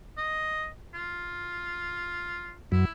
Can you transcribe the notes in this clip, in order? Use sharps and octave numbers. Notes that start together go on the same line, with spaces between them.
D#5
F4
F#2 F#3 E4